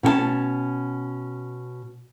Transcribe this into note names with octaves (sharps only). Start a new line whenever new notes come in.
B2 C#4 G5 A5